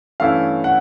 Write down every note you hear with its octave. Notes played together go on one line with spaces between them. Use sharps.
G2 E3 A3 C#4 E4 F5
F#5